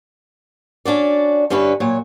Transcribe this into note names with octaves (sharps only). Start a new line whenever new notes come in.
C#4 D4 F#4 D5
G2 D3 C#4 E4 B4
A#2 F#3 C#5